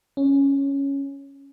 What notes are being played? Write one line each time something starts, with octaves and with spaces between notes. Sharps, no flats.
C#4